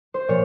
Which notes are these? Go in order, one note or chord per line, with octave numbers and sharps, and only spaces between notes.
C5
A#2 F3 C#5